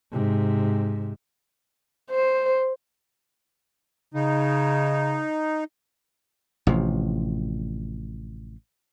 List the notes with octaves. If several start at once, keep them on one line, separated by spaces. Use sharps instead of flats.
G#2 C3
C5
C#3 D#4
A1 C3 F3